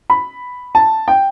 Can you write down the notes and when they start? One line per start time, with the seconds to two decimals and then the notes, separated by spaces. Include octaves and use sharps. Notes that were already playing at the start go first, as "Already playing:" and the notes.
0.10 B5
0.75 A5
1.08 G5